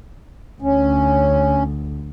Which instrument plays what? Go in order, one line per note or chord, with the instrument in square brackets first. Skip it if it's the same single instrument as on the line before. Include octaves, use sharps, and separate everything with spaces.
[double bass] D2 [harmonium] C#4